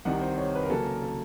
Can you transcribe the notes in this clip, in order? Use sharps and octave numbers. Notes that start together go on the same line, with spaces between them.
C2 C3 D#3 F#5
C5
C#5
B4
A#4
C#3 F#3 A#3 C#4 A4
A#4
A4